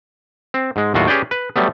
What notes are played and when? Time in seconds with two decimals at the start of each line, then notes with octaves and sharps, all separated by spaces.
0.54 C4
0.76 G#2 G#3
0.94 D#2 A2 F#3 F4 F#4
1.07 C#4 G4 G#4 B4 D5 G5
1.31 B4
1.56 F#3 G3 A3 B3